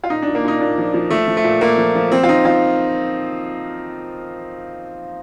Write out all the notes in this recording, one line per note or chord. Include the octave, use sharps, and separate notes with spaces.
F4
A#2 D#4
D4
A#2
A#3
A#2 D#4
A#2 D4
F3
F3
F3 A3
F3
A3
A#2
A#2 A#3
F3
F3
F3 C4
F4
F3 D#4
F3 F4